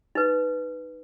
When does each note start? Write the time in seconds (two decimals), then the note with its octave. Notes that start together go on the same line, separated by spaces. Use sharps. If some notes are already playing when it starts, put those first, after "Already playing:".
0.15 D#4 B4